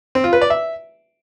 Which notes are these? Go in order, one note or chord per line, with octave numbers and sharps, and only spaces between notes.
C4
F4
B4
D5
E5